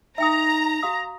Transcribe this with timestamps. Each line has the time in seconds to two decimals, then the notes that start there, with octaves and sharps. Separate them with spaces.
0.18 D#4 E5 G5 A#5 D#6
0.83 F#4 F5 D#6